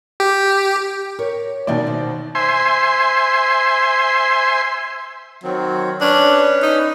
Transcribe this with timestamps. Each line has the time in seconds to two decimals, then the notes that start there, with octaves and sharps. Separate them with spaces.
0.20 G4
1.19 A#4 C#5
1.67 B2 D#3 E3 A#3 D5 G5
1.87 C5
2.35 C5 E5 G#5 C6
5.44 D#3 F#3 C4
6.01 C#4 D4 B4 C#5
6.63 D#4